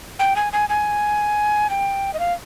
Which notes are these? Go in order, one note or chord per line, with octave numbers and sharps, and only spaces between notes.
G5
G#5
G#5
G#5
G5
D#5
F5